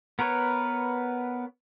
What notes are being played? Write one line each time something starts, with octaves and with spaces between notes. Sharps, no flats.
B3 A#4 B4 C#5